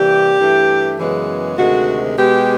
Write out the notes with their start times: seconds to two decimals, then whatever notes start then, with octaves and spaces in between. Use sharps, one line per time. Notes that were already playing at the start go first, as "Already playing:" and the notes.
Already playing: C3 E3 G3 A#3 G4
0.40 G2 E3 A3
0.99 F#2 C#3 E3 G#3 B3
1.58 D2 C3 D#3 G#3 F#4
2.18 B2 G#3 B3 G4